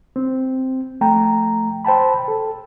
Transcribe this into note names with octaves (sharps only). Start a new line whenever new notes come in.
C4
F3 A3 G5 A#5
C5 G5 A5 B5
A4